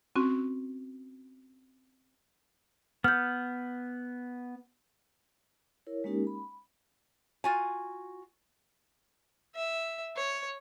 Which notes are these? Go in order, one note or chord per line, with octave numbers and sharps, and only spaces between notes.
C4 C#4 F#4
B3 F6 G6
E4 A#4 C#5
G#3 A#3 C#4 D#4 G4 A#4
B5
F4 F#4 G#5
E5
C#5